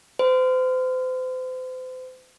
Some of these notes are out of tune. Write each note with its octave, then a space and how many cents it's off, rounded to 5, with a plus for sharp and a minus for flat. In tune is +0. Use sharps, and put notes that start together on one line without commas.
C5 -40